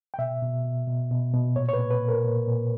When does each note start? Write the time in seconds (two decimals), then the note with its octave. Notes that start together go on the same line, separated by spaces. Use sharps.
0.14 G5
0.19 B2 E5
0.42 B2
0.65 B2
0.88 B2
1.11 B2
1.34 B2
1.56 A#2 C#5
1.69 C#5
1.73 B4
1.79 A#2
1.91 B4
2.02 A#2
2.08 A#4
2.25 A#2
2.48 A#2